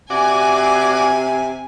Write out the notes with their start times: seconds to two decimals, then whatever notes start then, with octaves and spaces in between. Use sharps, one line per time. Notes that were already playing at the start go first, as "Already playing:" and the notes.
0.10 C3 F#4 D5 G#5 D6